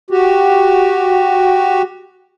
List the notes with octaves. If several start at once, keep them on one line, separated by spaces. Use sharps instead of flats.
F#4 G4